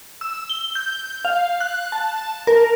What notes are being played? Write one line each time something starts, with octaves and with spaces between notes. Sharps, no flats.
E6
G7
G6
F5
F#6
A5
A#4